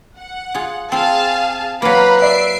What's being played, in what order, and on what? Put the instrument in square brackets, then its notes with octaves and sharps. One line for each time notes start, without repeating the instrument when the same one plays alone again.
[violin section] F#5
[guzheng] F4 G#4
[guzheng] C4 F4 [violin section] G#4 F5 A5
[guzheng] F#3 A#3 [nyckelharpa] B4 [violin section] F5 A#5 B5
[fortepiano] D5 [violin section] E5 C7 D7